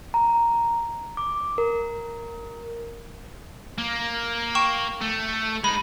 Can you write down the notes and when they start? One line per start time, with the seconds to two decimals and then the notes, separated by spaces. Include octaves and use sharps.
0.14 A#5
1.17 D6
1.58 A#4
3.78 A#3
4.55 G5 C#6 E7
5.01 A3
5.64 G#3 D#4 B5